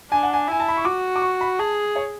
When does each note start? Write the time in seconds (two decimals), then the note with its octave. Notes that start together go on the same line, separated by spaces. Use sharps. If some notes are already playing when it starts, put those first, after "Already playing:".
0.11 D4 G#5
0.23 F#5
0.33 G#5
0.48 E4 G#5
0.60 A5
0.68 B5
0.77 C#6
0.85 F#4 D6
1.16 D6
1.22 C#6
1.41 B5
1.59 G#4 A5
1.96 C#5